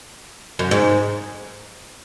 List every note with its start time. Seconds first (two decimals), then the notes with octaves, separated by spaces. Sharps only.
0.59 F#2
0.71 G#2